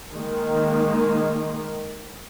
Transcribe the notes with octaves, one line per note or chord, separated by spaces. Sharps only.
D#3 G#3 A#3